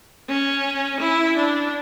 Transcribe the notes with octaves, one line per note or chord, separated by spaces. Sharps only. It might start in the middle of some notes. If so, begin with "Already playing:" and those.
C#4
E4
D4